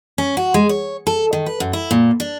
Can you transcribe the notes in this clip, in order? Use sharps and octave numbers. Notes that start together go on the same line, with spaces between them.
C#4
F#4
G#3
C#5
A4
D#3
B4
F#2
E4
A#2
D4